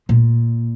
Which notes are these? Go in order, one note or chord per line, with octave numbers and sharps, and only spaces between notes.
A#2